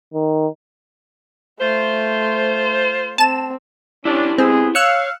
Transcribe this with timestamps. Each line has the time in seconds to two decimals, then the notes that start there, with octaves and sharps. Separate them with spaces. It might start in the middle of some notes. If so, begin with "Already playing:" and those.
0.14 D#3
1.61 A3 F4 C5
3.18 C4 A5 E7
4.05 C#4 D4 E4 G4
4.38 G#3 B3 C4 G#4
4.75 C#5 F5 E6 F#6 C#7